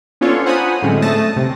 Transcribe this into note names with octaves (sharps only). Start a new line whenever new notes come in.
B3 C#4 D4 F4 A4 C#5
C5 F#5 G#5 A#5 B5 D#6
A2 D3 F#3 G#3 C4 C#4
A3 A5 D#6 A#6
C3